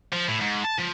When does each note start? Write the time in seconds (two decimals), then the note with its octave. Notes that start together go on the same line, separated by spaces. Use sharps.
0.13 F3
0.28 A2
0.41 G#2
0.64 A5
0.78 F3